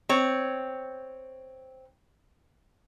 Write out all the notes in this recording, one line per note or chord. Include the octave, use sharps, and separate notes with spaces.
C4 C#5